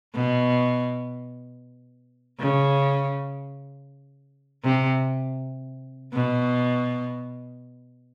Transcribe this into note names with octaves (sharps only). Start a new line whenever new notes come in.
B2
C#3
C3
B2